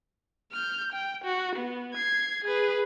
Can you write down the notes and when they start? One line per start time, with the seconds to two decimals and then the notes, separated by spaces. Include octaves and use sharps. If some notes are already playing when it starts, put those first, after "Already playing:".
0.52 F6 G6
0.93 G5
1.24 F#4
1.56 B3
1.94 G#6 C7
2.45 G#4 B4